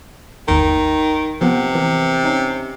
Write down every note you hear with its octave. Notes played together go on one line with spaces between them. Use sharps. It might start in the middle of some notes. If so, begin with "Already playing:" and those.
G1 D#2 D#3
C3 F3 B3 F#5
E3 A#4
C#4 D#4